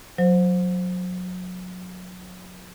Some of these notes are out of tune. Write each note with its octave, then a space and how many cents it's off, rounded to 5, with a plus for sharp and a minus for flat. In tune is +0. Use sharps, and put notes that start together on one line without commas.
F#3 -25 C5 +0